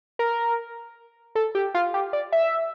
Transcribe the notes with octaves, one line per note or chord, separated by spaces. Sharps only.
A#4
A4
G4
F4
G4
D5
E5